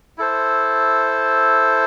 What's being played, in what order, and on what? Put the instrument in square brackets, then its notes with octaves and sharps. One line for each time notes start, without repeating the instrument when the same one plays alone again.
[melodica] E4 A4 C5